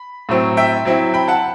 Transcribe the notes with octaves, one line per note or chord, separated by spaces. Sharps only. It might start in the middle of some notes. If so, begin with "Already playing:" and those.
Already playing: B5
A2 F#3 C4
E5 G5
F#3 C4 E4
G5 B5
F#5 A5